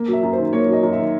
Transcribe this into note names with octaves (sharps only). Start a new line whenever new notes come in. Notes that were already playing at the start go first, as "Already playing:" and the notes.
Already playing: A#3
F#3 E5
F#2
C5
D#3
A#3 C#5
F#3 D#5
F#2
E5
D#3